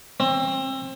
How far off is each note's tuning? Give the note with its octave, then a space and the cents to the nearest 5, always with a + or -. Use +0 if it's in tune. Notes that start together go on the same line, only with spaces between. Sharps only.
C4 +30